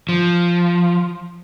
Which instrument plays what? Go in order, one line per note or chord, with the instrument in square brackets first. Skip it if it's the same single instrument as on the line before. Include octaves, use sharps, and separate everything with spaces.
[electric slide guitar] F3